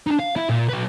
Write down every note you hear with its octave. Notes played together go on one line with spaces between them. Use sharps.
D4 D#4
F5
E4
A#2
F#3 B4